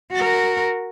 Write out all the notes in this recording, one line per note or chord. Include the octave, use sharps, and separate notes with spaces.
F#4 A#4